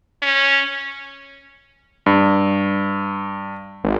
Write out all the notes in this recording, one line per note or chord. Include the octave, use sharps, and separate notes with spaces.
C#4
G2
G#1